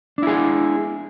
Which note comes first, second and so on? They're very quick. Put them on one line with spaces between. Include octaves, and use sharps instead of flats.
D4 E4 G#4